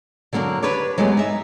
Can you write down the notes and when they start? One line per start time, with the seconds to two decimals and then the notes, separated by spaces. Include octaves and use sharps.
0.33 D3 F#3 A#3 C#4 D4
0.63 D4 G4 B4 C#5 D5
0.98 F#3 G#3 A3 B3 G4
1.17 D#4 E5